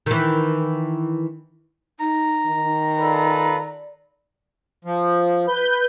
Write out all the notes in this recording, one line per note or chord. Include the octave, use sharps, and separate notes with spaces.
D#3 E3
D#4 A#5
D#3
F4 A4 B4 D5
F3
B4 G6